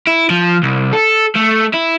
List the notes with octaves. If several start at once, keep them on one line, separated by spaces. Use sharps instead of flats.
E4
F3
C2
A4
A3
E4